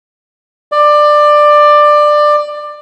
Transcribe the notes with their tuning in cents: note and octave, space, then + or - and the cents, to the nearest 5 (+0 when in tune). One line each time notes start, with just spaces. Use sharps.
D5 +20